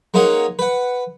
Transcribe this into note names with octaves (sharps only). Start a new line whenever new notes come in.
G#3 A#3 C#4 D#4 G#4 F#5
B4 F#5